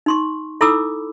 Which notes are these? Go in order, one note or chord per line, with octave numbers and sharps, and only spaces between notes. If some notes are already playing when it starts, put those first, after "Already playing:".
D#4 C6 C#6
D#4 E4 A4 B5 D6 E6